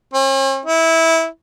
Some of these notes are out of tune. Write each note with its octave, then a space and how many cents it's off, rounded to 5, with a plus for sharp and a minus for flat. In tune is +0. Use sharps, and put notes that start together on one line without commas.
C#4 -45
E4 -15